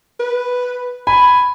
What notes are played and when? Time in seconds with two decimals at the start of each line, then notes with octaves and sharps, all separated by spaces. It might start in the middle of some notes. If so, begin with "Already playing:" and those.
0.20 B4
1.07 G#5 B5